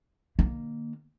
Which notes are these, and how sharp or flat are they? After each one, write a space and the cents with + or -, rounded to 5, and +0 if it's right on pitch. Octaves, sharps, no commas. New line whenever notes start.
D#3 -40 A#3 +0